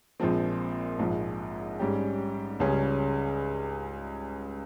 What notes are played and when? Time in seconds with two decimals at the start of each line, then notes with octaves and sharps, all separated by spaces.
0.20 A#1 A#2 F3 G#3 C4
0.99 A#1 G#2 F3 G#3
1.80 G#2 G3 C#4 G4
2.60 C#2 C#3 G3 C#4 G#4